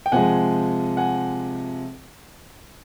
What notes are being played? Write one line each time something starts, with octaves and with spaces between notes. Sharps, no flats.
G5
C3 F3 G#3 F#5 G#5
F#5 G#5